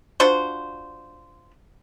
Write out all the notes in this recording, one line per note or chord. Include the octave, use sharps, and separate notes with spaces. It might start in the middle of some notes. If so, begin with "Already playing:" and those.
D4 F4 F#4 C5